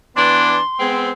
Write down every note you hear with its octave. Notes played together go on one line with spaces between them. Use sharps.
E3 B3 D4 C6
G#3 B3 C4